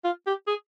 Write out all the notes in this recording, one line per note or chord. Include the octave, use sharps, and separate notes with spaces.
F4
G4
G#4